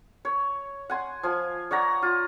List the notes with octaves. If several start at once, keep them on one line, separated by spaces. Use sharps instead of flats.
C#5
F#5 G#5 C6
F3 G#5
C#5 D5 F#5 A#5
F4